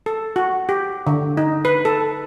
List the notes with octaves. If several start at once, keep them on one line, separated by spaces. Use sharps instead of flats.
A4
F#4
G4
D3
D#4
B4
A4